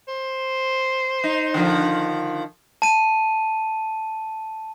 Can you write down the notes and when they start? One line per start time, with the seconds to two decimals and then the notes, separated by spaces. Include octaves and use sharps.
0.08 C5
1.24 D#4
1.54 D3 D#3 F3
2.82 A5 D#7